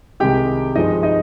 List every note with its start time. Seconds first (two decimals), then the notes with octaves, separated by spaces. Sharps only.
0.20 C2 C3 D#3 G#3 G4 G5
0.75 G2 F3 G#3 D#4 D#5
1.03 D#4 D#5